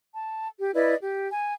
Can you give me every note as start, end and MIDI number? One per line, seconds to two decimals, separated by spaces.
0.14 0.48 81
0.59 0.69 67
0.74 0.95 64
0.74 0.95 71
0.74 0.95 74
0.74 0.95 75
1.00 1.28 67
1.31 1.54 80